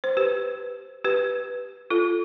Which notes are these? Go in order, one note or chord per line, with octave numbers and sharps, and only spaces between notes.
C5
G4 B4
G4 B4
F4 A4